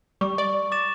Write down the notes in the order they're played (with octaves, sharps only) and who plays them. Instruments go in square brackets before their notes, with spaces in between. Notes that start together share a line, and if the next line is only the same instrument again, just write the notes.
[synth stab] G3 [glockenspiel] C#6
[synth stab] D5
[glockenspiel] D6 A6 E7